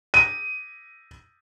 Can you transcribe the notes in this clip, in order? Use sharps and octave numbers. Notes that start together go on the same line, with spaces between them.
D#7